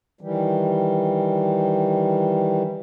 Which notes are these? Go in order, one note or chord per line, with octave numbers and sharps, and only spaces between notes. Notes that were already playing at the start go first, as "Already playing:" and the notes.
D#3 E3 G3